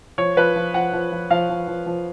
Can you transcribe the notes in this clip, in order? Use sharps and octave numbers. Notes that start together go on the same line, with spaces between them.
F3 C#5
F3 B4
F3
F3 F#5
F3
F3
F3 F5
F3
F3
F3